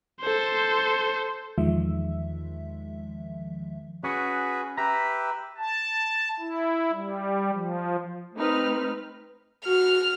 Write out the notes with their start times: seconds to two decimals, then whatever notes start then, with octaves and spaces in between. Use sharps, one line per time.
0.21 A4 C5
1.58 E2 D#3 F3 G#3 E5
4.03 C#4 F#4 G#4 B4
4.77 G4 B4 E5 A#5
5.58 A5
6.40 E4
6.93 G3
7.54 F3
8.36 A3 C4 D#4 B4 F6
9.65 F#4 F6